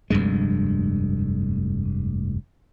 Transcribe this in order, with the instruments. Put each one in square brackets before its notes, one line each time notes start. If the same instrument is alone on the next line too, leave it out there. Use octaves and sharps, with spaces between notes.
[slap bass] F1 D2 G2 G#3